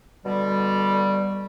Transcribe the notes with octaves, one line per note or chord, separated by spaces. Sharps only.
B2 D3 G3